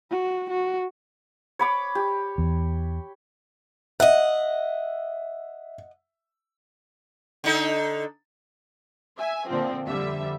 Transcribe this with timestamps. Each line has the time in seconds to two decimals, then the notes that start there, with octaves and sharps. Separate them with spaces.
0.11 F#4
0.51 F#4
1.59 C#5 B5 D6
1.95 G4
2.38 E2
4.00 D#5 E5 F#5
7.44 D3 D#4 A4
9.18 E5 G#5
9.48 A#2 D3 F3 C4
9.86 F2 D3 G3 E5